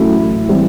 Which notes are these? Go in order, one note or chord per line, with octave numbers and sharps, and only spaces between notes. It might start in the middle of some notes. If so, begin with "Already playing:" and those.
Already playing: A1 A2 F#3 E4
E3 G3 C4